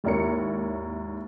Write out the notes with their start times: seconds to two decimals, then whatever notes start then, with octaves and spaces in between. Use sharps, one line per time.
0.04 G#1 D#2 E4 A#4 C#5 C#7